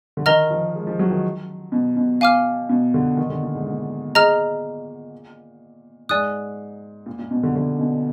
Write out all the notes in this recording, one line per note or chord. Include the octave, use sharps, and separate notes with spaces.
D3
D#3 A#4 D#5 A#5 F6
F3
G#3
F3
F#3
D#3
B2
B2
F5 G#5 D6 F6
B2
D3
D#3
D3
A#2
G#2
A#2
G#4 D#5 A#5 F6
G#2 D5 G#5 D#6 F#6
A#2
A#2
B2
D3
D3
B2